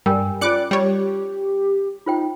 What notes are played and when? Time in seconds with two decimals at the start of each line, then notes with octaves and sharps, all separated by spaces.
0.06 G2 G3 A#4 G5 G#5
0.41 C#4 F4 C5 D5 D6 F#6 C#7
0.71 G3 G4 C#5
2.06 D#4 F4 C5 G5